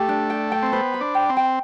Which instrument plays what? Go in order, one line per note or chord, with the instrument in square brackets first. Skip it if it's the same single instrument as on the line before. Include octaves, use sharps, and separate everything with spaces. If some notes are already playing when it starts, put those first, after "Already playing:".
Already playing: [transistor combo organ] A3 [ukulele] G4
[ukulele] D4
G5
G5
[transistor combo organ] C4
[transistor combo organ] B3 [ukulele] C5
[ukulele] B5
[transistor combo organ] D4
[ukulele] G5
[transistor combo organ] C4
[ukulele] G5